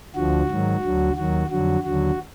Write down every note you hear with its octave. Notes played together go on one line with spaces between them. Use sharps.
D2 D3 F3 F#4
G#2 D#3 F#3
D2 D3 F#3
D#2 D#3 F#3 F#4
F2 D3 F#3 F#4
D#2 D3 F#3 F#4